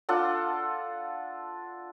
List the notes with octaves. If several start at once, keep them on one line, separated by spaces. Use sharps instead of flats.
D4 F4 A4 F#5